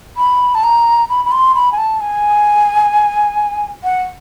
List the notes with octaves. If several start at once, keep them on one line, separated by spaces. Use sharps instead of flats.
B5
A5
A#5
B5
B5
C6
B5
G#5
A5
G#5
F#5